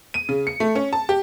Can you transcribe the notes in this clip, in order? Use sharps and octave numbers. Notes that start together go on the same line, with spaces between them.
D#7
C#3
C#7
A3
C#4
A5
G4